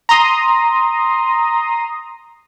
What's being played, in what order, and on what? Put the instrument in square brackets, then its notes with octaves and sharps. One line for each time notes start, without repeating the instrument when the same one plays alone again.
[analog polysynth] A#5 C6 D#6